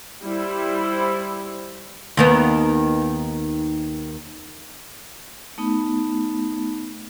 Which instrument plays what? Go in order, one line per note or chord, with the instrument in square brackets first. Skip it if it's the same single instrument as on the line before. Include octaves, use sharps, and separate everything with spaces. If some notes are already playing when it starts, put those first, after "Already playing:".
[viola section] G3 E4 C5
[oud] D#2 D#3 B3
[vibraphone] A3 B3 D#4